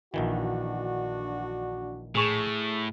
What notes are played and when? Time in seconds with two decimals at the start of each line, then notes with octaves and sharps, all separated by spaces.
0.14 A#1 D#3 E3 D4 F#4
2.15 A2 G#4 C#6 E7